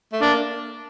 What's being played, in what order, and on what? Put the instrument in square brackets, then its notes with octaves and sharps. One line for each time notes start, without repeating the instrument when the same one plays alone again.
[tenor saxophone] A3
[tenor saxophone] A#3 [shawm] D4